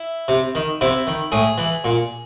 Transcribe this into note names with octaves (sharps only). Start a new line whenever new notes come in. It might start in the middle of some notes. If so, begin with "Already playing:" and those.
Already playing: E4
C3
D#3
C3 E4
D#3
A2 G#4
E3
A#2